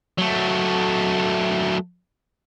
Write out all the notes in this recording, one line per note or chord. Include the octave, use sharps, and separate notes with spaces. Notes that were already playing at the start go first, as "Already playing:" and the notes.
F#3 A3